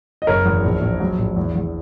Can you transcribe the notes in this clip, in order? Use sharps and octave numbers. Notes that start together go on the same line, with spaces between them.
D#5
F#1 A#4 C#5
E2
A#1
A#1
F#3
A#1
E2
E2